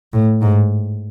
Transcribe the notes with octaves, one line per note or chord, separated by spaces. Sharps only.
A2
G#2